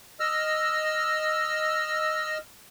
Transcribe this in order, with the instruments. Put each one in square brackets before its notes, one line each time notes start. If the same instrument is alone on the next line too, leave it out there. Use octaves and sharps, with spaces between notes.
[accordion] D#5 E6 F6